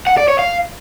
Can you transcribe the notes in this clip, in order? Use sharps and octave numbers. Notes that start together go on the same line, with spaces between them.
F#5
D5
C#5
F5